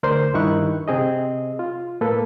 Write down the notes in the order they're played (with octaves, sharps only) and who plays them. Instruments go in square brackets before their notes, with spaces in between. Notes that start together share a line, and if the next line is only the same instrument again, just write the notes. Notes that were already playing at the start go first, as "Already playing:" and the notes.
[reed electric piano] D2 A#4 C5 D5 C6
G2 D#3 D#4 E4 C#6 F#6
C3 C4 G#4 D#5
F4
A2 A#3 A4 B4